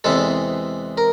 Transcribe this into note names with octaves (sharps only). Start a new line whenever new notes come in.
E2 C3 E3 G#3 A4
A#4